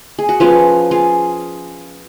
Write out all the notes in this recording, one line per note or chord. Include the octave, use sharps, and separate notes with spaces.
G#4
F#4
F3 B3 C#4 F4
F4 G#4